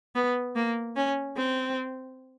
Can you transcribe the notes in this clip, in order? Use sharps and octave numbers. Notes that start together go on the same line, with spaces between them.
B3
A#3
C#4
C4